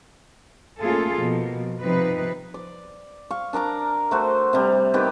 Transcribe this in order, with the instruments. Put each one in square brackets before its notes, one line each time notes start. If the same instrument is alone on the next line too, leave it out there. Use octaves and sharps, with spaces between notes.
[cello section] A3 A#3 C#4 F4 G#4 A4
B2 F3 A#3
C3 F3 C4 D#4 B4
[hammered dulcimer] D5
F5 C#6
D4 A#4 D5 A#5
A3 F#4 C5
C3 G3
D#3 B3 G4 D6